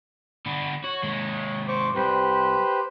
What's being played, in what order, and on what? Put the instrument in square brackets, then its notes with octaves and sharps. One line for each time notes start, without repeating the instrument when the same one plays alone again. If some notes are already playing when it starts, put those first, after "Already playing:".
[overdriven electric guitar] D3 B3
[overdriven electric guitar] F#4 [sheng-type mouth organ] C#5
[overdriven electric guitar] D#2 G#3
[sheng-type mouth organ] C5 C#6 D6
[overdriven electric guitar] C2 [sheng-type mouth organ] G4 B4 C5